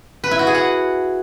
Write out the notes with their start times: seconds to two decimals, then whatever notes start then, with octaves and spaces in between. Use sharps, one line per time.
0.24 B4
0.31 E4
0.39 F#4
0.47 G#4
0.55 F#5